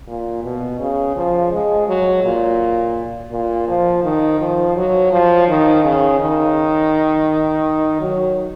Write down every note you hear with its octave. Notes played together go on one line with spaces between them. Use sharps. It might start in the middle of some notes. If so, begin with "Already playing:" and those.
A#2
B2
C#3
F3
G#3
F#3
A#2
A#2
F3
D#3
F3
F#3
F3
D#3
C#3
D#3
F#3